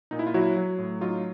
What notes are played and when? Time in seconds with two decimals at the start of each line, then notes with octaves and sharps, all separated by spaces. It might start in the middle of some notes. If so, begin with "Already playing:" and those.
0.11 A#2 D#4
0.19 E4
0.27 F4
0.34 F#3 E4 F#4
0.57 F#3
0.78 A2
1.01 F#3 D#4 F4